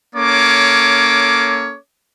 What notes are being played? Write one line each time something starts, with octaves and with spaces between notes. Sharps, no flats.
A#3 C#4 A4 C#5 D6